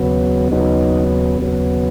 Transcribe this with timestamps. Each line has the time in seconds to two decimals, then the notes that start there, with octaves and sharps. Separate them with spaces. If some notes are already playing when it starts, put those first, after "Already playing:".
Already playing: D#2 C#3 F#3 B3
0.51 D#2 C#3 F#3 B3 D#4
1.40 D#2 C#3 F#3 B3